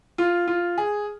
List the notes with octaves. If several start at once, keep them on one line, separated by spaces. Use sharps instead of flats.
F4
F4
G#4